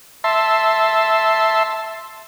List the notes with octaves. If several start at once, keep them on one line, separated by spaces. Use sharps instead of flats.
E5 A5 C6